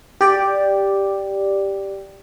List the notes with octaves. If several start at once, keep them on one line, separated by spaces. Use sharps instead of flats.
G4 D5